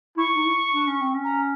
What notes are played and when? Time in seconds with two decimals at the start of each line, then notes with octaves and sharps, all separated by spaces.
0.17 E4 C#6
0.36 D#4
0.46 E4
0.74 D4
0.87 C#4
1.01 C4
1.14 C#4
1.24 A#5